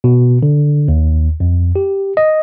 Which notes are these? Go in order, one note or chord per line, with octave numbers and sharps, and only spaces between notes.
B2
D3
D#2
F2
G4
D#5